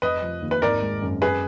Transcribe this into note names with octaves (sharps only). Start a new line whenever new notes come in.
F1 B4 D#5
F3
D#2
B4
G#1 A#4 D5
G#3
F#2
F#2 G#4 B4